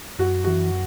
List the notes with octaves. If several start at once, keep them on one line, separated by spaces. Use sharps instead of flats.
F#2 F#4
E3 F#4